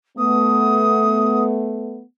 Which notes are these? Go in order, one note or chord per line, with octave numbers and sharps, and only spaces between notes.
A3 B3 D#6